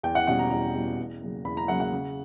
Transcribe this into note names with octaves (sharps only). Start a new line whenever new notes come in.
E2 G5
F#5
B2 G3 C#4 F#5
A#5
E2 A#5
B2 G3 C#4
E2
C#3 F#3 A#3
E2 B5
A#5
C#3 F#3 A#3 F#5
F#5
C#3